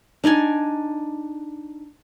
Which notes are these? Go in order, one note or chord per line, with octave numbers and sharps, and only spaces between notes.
D4 D#4 D5 G#5